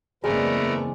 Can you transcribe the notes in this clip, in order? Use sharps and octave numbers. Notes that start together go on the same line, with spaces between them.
F#1 E2 G#3 A3 B3 C4 A#4 D5